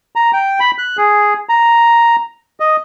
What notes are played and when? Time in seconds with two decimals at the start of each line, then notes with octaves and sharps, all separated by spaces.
0.16 A#5
0.33 G5
0.60 B5
0.78 F#6
0.97 G#4
1.49 A#5
2.60 D#5